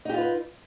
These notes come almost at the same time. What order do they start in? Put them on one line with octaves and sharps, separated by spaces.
D#4 G4 F4 B4